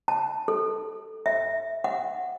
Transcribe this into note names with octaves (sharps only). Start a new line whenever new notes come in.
A5
A4
E5
F#5